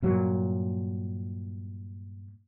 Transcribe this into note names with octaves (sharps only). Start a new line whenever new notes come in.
G2 A#2 F#3